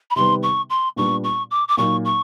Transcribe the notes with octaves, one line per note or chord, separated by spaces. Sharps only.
B5
C3 D#3 G3 B3 C6
C#6
C6
A#2 G3 B3 D4 F4 C#6
C#6
D6
D6
A#2 F#3 A#3 D#4 C#6
C#6